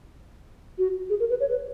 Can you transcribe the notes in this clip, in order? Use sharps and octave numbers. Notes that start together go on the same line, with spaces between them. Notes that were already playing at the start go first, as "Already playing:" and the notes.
F#4
G#4
A#4
B4
C#5
B4